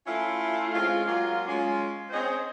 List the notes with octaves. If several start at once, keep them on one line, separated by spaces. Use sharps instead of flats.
A3 C#4 E4 F4
G#3 C4 C#4 F4
F#3 G#3 A#3 F4
G#3 C#4 F4
C4 C#4 G#4 C5 C#5 D#5